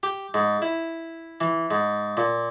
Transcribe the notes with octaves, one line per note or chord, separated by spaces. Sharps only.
G4
G#2
E4
E3
G#2
A#2